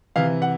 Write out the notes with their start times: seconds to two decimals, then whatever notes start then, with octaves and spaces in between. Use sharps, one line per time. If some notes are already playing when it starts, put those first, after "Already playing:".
0.16 C3 E3 F5
0.42 F#5